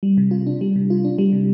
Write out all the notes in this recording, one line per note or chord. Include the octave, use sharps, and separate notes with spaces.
G3
C3
F4
D4
G3
C3
F4
D4
G3
C3